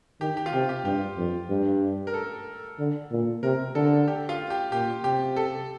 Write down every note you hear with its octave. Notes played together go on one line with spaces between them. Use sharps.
D#3 G4
G4
F4
C3 G4
G4
G2 G4
F2
G2
A#4
A4
D3
A#2
C3 A#4
D3 A4
G4
F4
G4
A#2 G4
C3 G4
A4